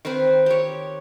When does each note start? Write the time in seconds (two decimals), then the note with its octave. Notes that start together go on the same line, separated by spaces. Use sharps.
0.05 D#3 C4 B4 C5
0.46 G4 C#5